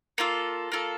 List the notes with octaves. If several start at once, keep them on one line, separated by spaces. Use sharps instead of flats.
A#3 F4 A4
A#3 F4 A4